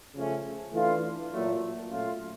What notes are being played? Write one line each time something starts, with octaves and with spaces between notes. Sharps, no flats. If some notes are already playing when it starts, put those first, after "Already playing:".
C#3 F3 A3 C#4
E3 A3 D4 F4
A#2 F#3 A3
A#2 F#3 A3 C#4 F4